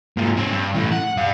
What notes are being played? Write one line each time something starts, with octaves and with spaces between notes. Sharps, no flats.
G#2 A#3
C4 C#5
G2
A2 E3
F#5
G2 F5